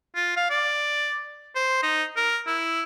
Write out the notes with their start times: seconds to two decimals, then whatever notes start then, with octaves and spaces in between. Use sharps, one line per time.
0.16 F4
0.37 F5
0.50 D5
1.55 C5
1.83 D#4
2.16 A#4
2.47 E4